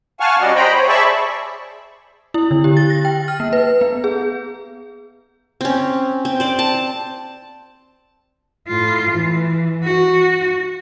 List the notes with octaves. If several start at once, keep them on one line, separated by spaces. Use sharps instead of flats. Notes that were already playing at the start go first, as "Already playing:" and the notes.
F5 F#5 G#5 A5 C#6 F6
G3 C#4 F#4 D5 D#5 F#5
C5 D#5 G5 A#5 B5
C5 C#5
G#4 D5 E5 A5 B5 C#6
E4
D3
G4
A6
A#6
G5
F6
A#3
B4
B3
G#4
C4 C#4
C4
C5 D5
A5
A2 F4
E3
F#4